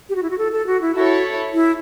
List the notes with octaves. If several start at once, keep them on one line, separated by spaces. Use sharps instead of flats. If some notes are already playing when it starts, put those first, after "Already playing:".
G4
F#4
E4
F#4
A4
A4
F#4
E4
E4 F#4 A4 C#5
E4